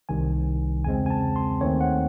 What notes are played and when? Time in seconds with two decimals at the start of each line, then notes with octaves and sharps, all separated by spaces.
0.09 C2 C3 D#3 G#5
0.85 E2 C#3 G#3 C4 G#5
1.06 G#5
1.10 A5
1.36 C6
1.61 D#2 D#3 A3 C4 C#5
1.81 F#5